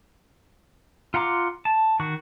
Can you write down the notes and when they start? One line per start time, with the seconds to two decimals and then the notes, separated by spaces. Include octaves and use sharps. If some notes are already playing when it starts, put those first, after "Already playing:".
1.14 F4 F#5 A#5 C6 D6
1.65 A5
2.00 D#3 F#4 C#6